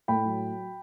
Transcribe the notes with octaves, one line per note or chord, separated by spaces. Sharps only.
A2 G5 B5
F#3